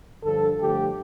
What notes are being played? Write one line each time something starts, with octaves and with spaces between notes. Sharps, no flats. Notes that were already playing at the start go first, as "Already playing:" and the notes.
G2 D3 F3 A4
G2 D3 F3 A3 G4